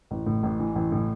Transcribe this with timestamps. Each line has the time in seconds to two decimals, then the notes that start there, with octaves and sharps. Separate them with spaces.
0.11 A1
0.26 A2
0.43 A1
0.60 E3
0.76 A1
0.92 A2